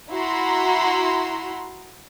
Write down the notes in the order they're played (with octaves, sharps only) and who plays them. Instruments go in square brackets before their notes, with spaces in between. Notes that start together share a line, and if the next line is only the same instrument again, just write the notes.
[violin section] E4 F#4 A#5 C6